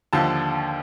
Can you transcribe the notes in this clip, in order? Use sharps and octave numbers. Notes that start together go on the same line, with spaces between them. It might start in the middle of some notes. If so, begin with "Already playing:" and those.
D#2 D3 F3 A5